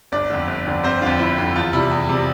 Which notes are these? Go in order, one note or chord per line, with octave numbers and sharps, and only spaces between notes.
G1 D4 D5
F2 D3
G1
F2 D3
G1 C4 C5
F2 D3 F4
G1 E4
F2 D3
E2 F4
C3 G3 E4
E2
C3 G3